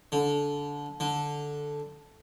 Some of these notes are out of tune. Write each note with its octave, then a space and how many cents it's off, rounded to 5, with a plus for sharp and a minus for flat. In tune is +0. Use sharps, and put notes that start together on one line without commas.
D3 -20
D3 -5